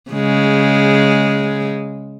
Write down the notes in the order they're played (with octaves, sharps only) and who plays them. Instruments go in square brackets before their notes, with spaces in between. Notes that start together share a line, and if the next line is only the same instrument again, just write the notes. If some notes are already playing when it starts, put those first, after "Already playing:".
[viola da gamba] C#3 G#3